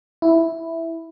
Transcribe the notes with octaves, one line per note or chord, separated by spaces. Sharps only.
E4